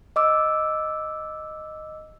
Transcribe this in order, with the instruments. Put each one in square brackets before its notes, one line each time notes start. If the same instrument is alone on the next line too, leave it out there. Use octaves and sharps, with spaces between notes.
[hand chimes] D#5 D6 E6